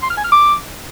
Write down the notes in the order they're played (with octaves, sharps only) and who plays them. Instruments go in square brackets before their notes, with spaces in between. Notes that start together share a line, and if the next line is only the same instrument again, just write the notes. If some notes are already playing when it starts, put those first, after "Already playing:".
[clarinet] C6
F6
G#5
F6
D6